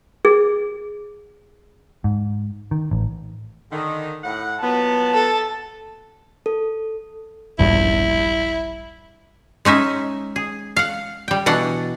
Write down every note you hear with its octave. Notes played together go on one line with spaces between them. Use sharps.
G#4
G#2
D#3
A1
D3 D#3
A2 F#5
A#2 F#3 B3 A5
A4
A4
E1 A#1 G2 E4
G#3 C#4 D#4 E5
G#4
F5 F#5
G3 G5
B2 E3 D4 F#5